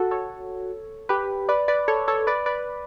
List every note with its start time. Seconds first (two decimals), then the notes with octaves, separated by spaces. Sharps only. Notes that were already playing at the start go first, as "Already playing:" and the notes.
Already playing: F#4 A4
0.11 A4 C#5
1.09 G4 B4
1.49 B4 D5
1.68 B4 D5
1.88 A4 C#5
2.08 A4 C#5
2.27 B4 D5
2.46 B4 D5